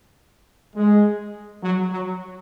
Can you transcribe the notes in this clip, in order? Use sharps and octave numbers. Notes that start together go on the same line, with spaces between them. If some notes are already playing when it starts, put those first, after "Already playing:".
G#3
F#3
F#3